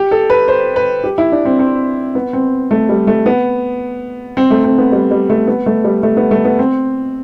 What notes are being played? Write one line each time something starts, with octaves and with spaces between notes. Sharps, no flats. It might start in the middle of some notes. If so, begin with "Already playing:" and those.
Already playing: G4
A4
B4
C5
B4
G4
E4
D4
C4
C4
B3
C4
A3
G3
A3
B3
C4
A3
C4
B3
G3
G3
A3
B3
A3
G3
A3
B3
A3
B3
C4